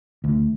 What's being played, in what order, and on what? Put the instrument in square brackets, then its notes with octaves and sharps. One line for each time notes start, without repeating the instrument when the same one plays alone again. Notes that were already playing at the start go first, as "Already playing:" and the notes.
[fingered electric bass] D2